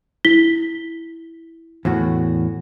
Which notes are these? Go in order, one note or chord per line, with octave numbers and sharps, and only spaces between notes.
E4 B6 G7
E2 A2 F#4